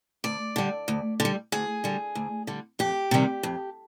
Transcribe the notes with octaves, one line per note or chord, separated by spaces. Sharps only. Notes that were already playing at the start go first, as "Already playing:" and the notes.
D2 D5
D3 G3
D2
D3
G3
D2 G#4
D3 G3
D2
D3 G3
F2 G4
C3 D#3 G3
F2